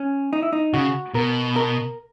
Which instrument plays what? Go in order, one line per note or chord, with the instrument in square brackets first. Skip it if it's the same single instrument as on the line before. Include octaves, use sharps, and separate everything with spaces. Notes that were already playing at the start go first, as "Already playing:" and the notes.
Already playing: [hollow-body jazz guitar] C#4
D#4
E4
D#4
[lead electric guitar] C#3 [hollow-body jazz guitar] F#4
[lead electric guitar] B2 [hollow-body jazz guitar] A#4
[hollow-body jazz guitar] A#4